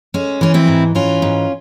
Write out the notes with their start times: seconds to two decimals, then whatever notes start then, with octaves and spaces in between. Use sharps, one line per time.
0.14 G#3 C#4
0.41 E3 C#4
0.54 C4 E4
0.68 G#2
0.95 E3 C#4 F4
1.22 G#2